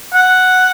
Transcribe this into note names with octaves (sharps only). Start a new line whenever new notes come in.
F#5